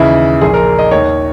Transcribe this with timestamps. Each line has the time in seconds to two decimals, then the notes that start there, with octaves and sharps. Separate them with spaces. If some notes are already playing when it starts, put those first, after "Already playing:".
Already playing: D#2 C#3 E3 E4
0.41 A#1 A#2 G#4
0.54 A#4
0.79 D#5
0.91 D#2 D#3 C#5